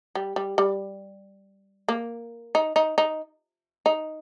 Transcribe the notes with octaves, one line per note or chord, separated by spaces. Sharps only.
G3
G3
G3
A#3
D#4
D#4
D#4
D#4